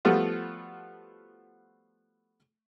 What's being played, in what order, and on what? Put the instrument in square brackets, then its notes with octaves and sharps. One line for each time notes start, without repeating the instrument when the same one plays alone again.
[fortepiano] F3 G3 A3 B3 F4 F#4